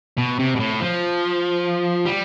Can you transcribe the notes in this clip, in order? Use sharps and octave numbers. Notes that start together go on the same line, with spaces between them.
B2
C3
B2
A2
F3
G3